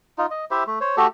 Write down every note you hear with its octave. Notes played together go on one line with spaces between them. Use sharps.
D#4 F4
D#5
E4 G4 C5 E5
A3
C5 C#5
A3 F#4 G4 A4